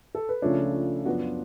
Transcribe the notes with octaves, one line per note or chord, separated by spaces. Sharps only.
A4
B4
C#2 C#3 F3 A3 D4 C#5
F#2 F3 B3 D4 F#4
F4